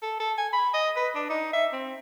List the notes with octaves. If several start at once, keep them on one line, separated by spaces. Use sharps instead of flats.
A4
A4
G#5
B5
D#5
B4
D4
D#4
E5
C4